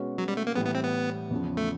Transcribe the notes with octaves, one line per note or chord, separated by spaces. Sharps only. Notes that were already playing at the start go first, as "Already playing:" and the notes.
Already playing: B2 G#3 C#4 F#4 B4
F#3
G3
A3
A#3
A2 E3 G3 B3
B3
C4
B3
E2 C#3 F3
A3